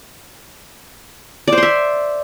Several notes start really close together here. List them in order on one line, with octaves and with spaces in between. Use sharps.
D5 C5 C6 E5